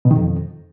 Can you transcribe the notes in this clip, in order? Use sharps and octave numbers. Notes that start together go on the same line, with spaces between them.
B2
D#3
F2